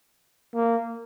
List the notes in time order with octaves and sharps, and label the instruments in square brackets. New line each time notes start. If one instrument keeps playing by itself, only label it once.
[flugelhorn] A#3